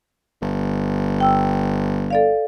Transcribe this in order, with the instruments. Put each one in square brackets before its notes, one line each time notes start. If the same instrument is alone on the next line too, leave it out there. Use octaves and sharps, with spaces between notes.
[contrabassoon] G1
[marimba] G5 E6
A4 D5 F5